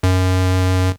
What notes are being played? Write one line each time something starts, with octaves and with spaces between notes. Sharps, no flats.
F#2